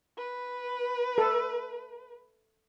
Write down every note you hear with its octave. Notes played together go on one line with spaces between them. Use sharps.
B4
A4